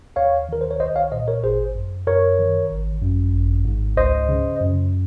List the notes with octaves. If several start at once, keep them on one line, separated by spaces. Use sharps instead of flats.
D#2 C#5 F5
D#3 A#4
C5
C#5
C2 C5 D#5
C#5 F5
A#2 C5 D#5
A#4 C#5
G#1 G#4 C5
F#2
F#2 A#4 C#5
D#3
G#1
F#2
G#1
G#2
C#2 C5 D#5
C#3
F#2